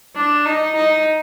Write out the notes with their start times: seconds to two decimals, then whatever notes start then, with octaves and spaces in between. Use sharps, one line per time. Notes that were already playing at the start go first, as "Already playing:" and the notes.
0.16 D4
0.46 D#4
0.76 D#4